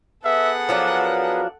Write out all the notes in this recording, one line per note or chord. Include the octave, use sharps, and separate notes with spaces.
B3 G#4 A4 B4 E5 F#5
F3 F#3 D4 A#4